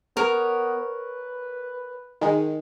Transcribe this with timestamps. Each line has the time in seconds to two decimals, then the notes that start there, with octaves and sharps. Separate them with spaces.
0.17 B3 A#4 C#5
0.80 B4
2.21 D#3 G#3